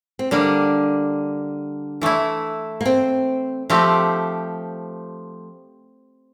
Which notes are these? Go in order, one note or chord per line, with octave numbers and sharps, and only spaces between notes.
C4
D3 G3 A#3 D4
E3 A3 E4
A#3
C4
F3 A3 C4 G4